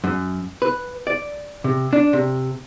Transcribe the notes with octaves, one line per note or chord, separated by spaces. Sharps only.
F#2
B4
D5
C3
D4
C3